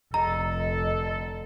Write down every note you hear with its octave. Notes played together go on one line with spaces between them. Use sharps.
F1 D3 A4 D#5 A#5